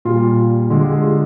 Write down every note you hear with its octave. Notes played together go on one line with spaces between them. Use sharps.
A#2 G3 F4
D3 G#3 F4
G4
G#4
F4